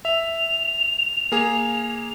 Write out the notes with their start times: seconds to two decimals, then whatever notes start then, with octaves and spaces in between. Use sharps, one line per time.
0.05 E5 F7
1.32 A#3 G#4